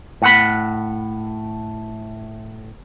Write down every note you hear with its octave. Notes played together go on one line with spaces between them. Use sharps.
A2 F#5 B5